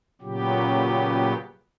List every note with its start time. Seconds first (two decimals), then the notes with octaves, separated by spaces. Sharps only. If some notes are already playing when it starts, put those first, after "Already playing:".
0.21 A#2 C#3 F#3 B3 G4